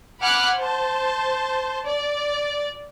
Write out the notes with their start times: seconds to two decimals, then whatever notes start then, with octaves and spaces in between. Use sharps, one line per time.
0.22 F#5 G#5 B5 D6 F6 F#6
0.57 C5 A5
1.85 D5